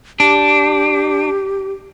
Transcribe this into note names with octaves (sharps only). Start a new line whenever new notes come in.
D4 G4